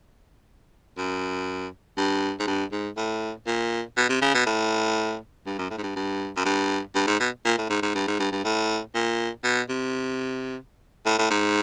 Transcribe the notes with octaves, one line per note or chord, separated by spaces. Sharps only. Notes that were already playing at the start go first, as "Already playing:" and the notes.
F#2
G2
G#2
G2
G#2
A2
A#2
B2
C3
C#3
B2
A2
G2
F#2
A2
G#2
G2
G2
F#2
G2
G2
G#2
B2
A#2
A2
G#2
G#2
G2
G#2
G2
G2
A2
A#2
B2
C3
A2
A2
G#2